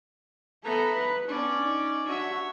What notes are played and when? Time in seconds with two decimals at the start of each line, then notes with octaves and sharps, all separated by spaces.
0.64 B3 A4 E5 A#5
0.94 B4
1.28 B3 C#4 D4 D5
1.61 D#4
2.06 D4 F#4 C#5 E5